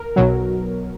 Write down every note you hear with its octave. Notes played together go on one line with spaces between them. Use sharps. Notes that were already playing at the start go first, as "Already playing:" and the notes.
Already playing: A#4
B1 B2 F#3